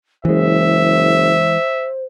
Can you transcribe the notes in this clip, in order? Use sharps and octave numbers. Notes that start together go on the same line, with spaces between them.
F#1 E3 G#3 C5 E5